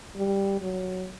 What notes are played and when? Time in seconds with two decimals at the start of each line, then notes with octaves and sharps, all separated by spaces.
0.16 G3
0.61 F#3